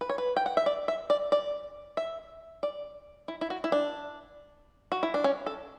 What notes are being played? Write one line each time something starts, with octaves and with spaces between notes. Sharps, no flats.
B4
C#5
B4
G5
F#5
E5
D5
E5
D5
D5
E5
D5
E4
E4
F#4
E4
D4
F#4
E4
D4
C#4
A4